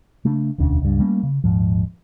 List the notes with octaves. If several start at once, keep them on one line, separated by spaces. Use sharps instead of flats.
C#3 A3 D4
E1 D2 C#4 D4
C#2 G2
G3 A3 A#3 C#4
C#3
D#1 G#2 F3